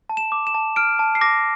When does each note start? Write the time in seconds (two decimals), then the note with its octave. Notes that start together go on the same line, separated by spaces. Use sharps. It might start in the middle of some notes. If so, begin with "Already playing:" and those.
0.09 A5
0.17 E7
0.32 D6
0.47 E7
0.55 A5
0.76 F6 D7
0.99 A5
1.15 C7
1.21 D6 A#6